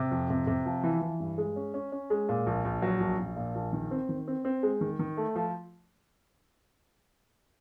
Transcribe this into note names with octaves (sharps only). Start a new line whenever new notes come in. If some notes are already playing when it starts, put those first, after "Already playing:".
Already playing: C3
F2
C3
C3
F3
E3
E3
G2
G#3
C#4
C#4
C#4
G#3
A#2
A#1
A#1
F#3
A#1
A#1
A#2
A#1
D#3
C4
D#3
C4
C4
G#3
D#3
D#3
A3
F3